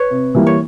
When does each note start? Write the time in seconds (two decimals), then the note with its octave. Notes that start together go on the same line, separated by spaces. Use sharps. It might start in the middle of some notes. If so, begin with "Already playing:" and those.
Already playing: B4 C#5
0.10 C3
0.35 E3 G3 A#3
0.47 C#5